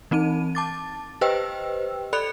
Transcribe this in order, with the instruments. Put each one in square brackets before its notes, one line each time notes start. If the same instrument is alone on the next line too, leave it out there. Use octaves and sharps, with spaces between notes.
[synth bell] E3 C4 D#4 D#7
A5 D6 A6
G4 B4 C5 D#5 G5 E6
A4 D5 B5 F#6 C#7 F7